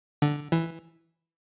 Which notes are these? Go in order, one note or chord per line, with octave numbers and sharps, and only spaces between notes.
D3
E3